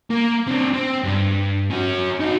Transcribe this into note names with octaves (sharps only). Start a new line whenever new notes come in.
A#3
C4 D4
C4
G2
C#4 F#4
D#4 F#4